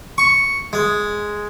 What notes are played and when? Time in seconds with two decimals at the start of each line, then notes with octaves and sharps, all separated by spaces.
0.18 C#6
0.73 G#3